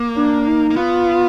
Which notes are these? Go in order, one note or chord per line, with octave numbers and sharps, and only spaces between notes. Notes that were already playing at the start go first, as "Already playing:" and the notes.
Already playing: A#3
D4
D#4
A#3
B3 F4